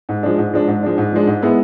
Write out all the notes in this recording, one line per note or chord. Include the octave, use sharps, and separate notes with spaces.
G#2
F3 G#3 D4
G#2
F3 G#3 D4
G#2
F3 G#3 D4
G#2
F3 G#3 D4
G#2
G#3 B3 E4